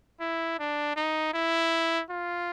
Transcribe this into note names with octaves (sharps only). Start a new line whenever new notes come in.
E4
D4
D#4
E4
F4